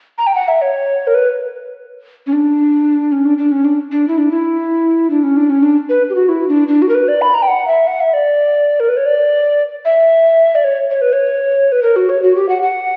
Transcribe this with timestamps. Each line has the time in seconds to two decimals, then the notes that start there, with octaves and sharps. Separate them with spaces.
0.18 A#5
0.27 G5
0.35 F#5
0.48 E5
0.62 C#5
1.07 A#4
1.14 B4
2.27 C#4
2.33 D4
3.12 C#4
3.25 D4
3.38 D4
3.52 C#4
3.65 D4
3.91 D4
4.08 E4
4.18 D4
4.31 E4
5.10 D4
5.24 C#4
5.37 D4
5.50 C#4
5.63 D4
5.89 B4
6.10 G4
6.15 F#4
6.29 E4
6.48 D4
6.68 D4
6.82 F#4
6.89 A#4
6.95 B4
7.08 D5
7.22 B5
7.34 A#5
7.42 G5
7.48 F#5
7.68 E5
7.87 F#5
8.00 E5
8.14 D5
8.80 A#4
8.89 B4
8.97 C#5
9.06 D5
9.85 E5
10.55 D5
10.64 C#5
10.91 C#5
11.02 B4
11.13 C#5
11.72 B4
11.83 A#4
11.96 F#4
12.09 C#5
12.23 F#4
12.36 G4
12.49 F#5
12.62 F#5